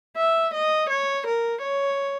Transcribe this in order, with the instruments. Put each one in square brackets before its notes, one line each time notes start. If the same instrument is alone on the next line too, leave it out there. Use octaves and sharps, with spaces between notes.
[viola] E5
D#5
C#5
A#4
C#5